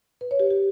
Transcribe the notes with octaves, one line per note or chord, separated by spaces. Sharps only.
B4
C#5
G4
G4